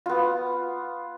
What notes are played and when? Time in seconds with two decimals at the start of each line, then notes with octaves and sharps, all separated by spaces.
0.06 B3 F4